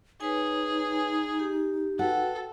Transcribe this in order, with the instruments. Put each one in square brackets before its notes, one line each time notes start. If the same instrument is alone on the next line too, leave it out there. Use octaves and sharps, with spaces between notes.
[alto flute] D#4 [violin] G#4 [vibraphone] B4 C#5 G#5
[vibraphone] G4
[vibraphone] F#4 B4 G5 [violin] A4 [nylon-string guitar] F#5